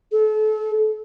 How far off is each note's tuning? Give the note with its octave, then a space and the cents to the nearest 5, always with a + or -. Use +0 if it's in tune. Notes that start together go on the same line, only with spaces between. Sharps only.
A4 -35